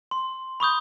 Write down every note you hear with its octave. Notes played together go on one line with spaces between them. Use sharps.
C6
B5 C#6 D#6 G6